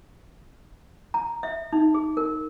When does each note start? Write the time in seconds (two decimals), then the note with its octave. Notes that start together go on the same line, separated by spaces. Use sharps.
1.14 A#5
1.43 E5
1.73 D#4
1.94 G#4
2.17 A#4